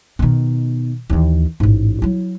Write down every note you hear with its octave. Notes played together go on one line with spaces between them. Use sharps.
B2 D#3
D#2 E3
A1 G#2
F#3 E4